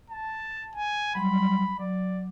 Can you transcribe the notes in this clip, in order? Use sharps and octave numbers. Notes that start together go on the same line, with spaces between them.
A5
G#5
F#3 G3 B5 C6
F#3 D5